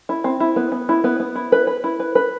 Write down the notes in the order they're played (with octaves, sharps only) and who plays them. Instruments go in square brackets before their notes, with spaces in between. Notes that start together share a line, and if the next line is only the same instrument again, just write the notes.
[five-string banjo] E4
C4
E4
B3
B3
E4
B3
B3
E4
B4
B4
E4
B4
B4